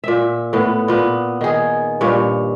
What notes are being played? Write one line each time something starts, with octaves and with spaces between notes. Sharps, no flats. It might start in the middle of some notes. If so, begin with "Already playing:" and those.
A#2 E5
A2 B3
A#2 B3
D#3 G#4
G2 A#2 C#5